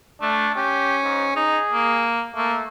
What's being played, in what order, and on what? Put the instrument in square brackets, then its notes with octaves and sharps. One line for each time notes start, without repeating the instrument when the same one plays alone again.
[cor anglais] A3 [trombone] D4
[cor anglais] C#4 [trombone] G4
[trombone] G#2
[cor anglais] D#4 [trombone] G#4
[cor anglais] A#3
[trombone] A3 [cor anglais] A#3